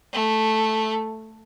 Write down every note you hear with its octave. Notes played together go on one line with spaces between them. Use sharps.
A3